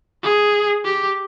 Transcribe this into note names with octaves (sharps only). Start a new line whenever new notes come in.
G#4
G4